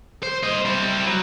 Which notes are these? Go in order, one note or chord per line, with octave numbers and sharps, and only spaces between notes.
C5
C5 D#5
G3 E4
F#3